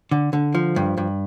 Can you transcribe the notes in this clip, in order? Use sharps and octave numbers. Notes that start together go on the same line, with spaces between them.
D3
D3
F3
G2
G2